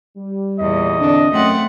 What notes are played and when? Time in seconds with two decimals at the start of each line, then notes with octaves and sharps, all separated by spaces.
0.18 G3
0.60 E2 A#2 D#5
1.00 D3 C4 D4
1.32 F#2 A3 C4 F#5